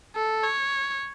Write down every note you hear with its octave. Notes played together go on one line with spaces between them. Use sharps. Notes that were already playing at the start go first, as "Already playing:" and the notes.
A4
C#5